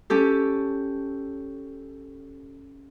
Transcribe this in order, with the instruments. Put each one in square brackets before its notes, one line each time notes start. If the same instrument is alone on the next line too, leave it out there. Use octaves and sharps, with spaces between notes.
[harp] C#4 G4 A4